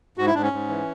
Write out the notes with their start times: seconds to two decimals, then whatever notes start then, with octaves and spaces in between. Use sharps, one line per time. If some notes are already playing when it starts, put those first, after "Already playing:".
0.18 G#2 F#4
0.27 E4
0.34 G#2 D4
0.43 C#4
0.52 G#2
0.68 E3